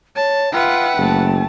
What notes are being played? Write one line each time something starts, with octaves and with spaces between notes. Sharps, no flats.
C#5 A5
F4 B4 E5 F#5 G5
F#1 A3 A5